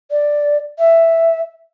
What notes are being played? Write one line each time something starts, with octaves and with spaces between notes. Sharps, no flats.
D5
E5